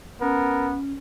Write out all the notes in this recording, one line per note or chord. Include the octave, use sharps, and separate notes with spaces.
B3 C#4 A#4